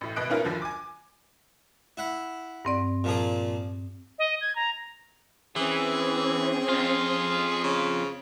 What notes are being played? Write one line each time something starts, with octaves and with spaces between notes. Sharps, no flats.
A1 A2
G#1 B2 D#5 F#6 D7
A#3 B3 C#4 D#4 F4 A#4
F#1 D#2 D3 F3
G#5 D6
E4 F#5
G2 C4 D5
A#2 F3 G#4
D#5
G#6
A#5
E3 C4 C#4 G#4
F2 F4
C#3